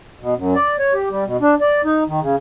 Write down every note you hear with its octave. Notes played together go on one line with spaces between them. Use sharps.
B2
F#2
D5
C#5
G4
G3
B2
D4
D5
D#4
D#3
C#3